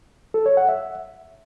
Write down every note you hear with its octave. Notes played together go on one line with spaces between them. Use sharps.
A4
C#5
F#5
E5